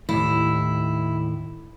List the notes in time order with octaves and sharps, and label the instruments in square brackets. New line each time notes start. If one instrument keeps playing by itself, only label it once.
[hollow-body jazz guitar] D#2 A2 [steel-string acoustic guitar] E4